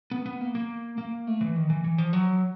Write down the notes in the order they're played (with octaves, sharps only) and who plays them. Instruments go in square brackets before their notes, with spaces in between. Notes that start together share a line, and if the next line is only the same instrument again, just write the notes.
[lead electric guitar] B3
B3
A#3
A#3
A#3
A3
E3
D#3
E3
E3
F3
F#3